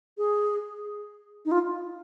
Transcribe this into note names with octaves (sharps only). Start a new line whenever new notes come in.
G#4
D#4
F4